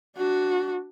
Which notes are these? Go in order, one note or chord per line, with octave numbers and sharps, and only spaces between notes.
D4 F#4